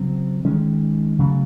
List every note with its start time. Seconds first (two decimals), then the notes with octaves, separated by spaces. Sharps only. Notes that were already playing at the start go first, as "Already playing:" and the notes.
Already playing: C#3 F#3 C4
0.44 D#3 G#3 C#4
1.19 C#3 F#3 A3